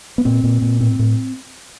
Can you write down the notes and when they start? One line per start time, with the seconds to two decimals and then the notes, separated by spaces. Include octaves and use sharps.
0.18 B3
0.25 A#2 C4
0.44 A#2
0.62 A#2
0.80 A2 C4
0.99 A2